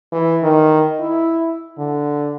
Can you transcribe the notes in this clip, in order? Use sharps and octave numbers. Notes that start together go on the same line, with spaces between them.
E3
D#3
E4
D3